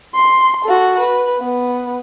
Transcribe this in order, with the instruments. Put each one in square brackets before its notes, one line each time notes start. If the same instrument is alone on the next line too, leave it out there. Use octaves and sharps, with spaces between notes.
[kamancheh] C6
F#4 A4
B4
B3